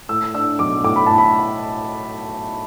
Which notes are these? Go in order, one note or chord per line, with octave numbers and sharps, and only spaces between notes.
A2 E6
D4 E6
B1 D6
A2 D6
B5
A2 A5
B5